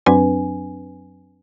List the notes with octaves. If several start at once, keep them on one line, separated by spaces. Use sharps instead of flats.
F#2 F#3 C4 D4 B4 G#5